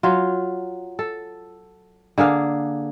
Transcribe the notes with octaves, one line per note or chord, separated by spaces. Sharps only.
F#3 F4
A4
D3 A#3 G#4 F5